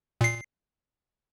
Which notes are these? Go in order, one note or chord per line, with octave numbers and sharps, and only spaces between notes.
A#2 C7